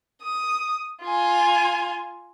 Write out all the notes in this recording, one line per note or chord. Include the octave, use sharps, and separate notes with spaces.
D#6
F4 G#5